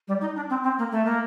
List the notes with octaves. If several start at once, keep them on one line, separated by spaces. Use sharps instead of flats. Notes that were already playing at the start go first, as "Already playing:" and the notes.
G3
D#4
D4
C4
C4
A#3
A3
A#3